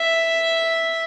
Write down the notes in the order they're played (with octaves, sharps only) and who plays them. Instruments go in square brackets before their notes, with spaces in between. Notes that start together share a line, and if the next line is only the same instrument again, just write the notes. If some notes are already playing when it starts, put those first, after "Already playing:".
Already playing: [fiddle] E5